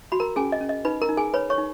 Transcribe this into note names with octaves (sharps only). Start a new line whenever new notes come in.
F#4 B5
A#4 A#5
C#4 G#4 G#5
D#5
C#4
D#5
D#4 B4 B5
A#4 A#5
D#4
G#4 G#5
B4 C#5 B5
C#5 C#6
D#4